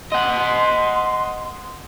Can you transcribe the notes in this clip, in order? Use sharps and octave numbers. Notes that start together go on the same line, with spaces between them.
D#5 F#5 C6